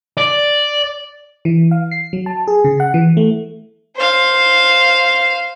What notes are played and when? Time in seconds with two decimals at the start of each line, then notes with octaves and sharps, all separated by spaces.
0.17 D5
1.45 E3
1.71 F5
1.91 C7
2.13 F#3
2.26 A5
2.48 G#4
2.64 C#3
2.80 F#5
2.94 E3
3.17 A3
3.96 C5 F5